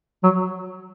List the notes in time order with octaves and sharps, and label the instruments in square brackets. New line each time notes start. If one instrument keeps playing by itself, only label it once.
[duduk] F#3